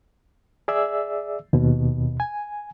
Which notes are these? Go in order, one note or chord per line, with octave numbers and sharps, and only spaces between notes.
G#4 D5 E5 E6
D#2 B2
G#5